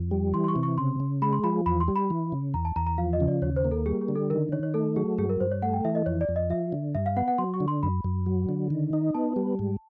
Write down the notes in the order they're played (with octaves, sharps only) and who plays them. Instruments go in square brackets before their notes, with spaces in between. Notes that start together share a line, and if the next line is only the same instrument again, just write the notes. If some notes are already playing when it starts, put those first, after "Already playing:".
Already playing: [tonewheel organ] F2
G3
[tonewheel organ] E3 [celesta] C6
[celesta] C6
C#6
[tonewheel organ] C3
[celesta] C#6
[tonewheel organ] C#3 [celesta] C6
[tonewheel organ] C#3
[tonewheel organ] G#3 [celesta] B5
[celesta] C6
[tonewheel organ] F3 [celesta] B5
[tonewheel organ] E2 [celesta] B5
[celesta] C6
[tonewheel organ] G3
[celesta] B5
[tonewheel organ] E3
C#3
[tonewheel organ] E2 [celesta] A#5
[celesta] A5
[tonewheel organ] E2 [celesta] A#5
[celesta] A#5
[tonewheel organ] F3 [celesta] F5
[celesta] D#5
[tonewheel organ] C#3
[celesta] D5
[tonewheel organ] D#2 [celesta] C#5
[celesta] C5
[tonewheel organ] A#3
[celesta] A4
[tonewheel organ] G3 [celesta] G#4
[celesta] G#4
[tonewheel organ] D3
[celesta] A4
[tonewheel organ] D#3 [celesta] A#4
[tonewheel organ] D#3 [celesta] C#5
[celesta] C#5
[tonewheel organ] A3 [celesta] A4
[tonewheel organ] F#3 [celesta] G#4
[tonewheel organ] G2 [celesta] G#4
[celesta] A#4
[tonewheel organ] G2 [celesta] C5
[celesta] C#5
[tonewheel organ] A3 [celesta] F#5
[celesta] G5
[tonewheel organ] E3 [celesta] E5
[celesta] D#5
[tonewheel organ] F2 [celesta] C#5
[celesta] D5
[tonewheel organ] F2
[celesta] D#5
[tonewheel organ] F3 [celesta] E5
[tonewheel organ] D3
[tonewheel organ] G2 [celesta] E5
[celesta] F5
[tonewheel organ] B3 [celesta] F#5
[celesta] F#5
[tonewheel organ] F#3 [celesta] C6
[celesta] C#6
[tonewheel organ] D3
[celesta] C6
[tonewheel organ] F#2 [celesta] B5
[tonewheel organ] F#2
F#3
D3
D#3
D#4
[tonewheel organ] B3 [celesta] A5
[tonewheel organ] G3
G#2